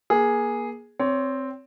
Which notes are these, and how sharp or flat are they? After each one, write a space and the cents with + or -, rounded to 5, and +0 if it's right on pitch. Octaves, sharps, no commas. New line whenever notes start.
A#3 +30 G#4 +0
C4 +0 C#5 +25